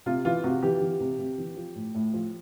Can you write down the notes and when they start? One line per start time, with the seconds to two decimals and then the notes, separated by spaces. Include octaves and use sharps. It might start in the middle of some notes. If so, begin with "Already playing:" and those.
0.06 C3 F4
0.25 E3 F4
0.44 C3 F#4
0.63 E3 G4
0.81 E3
1.00 C3
1.19 C3
1.38 E3
1.57 F3
1.75 A2
1.95 A2
2.14 F3